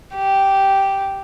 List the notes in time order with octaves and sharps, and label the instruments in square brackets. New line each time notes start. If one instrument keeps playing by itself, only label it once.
[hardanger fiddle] G4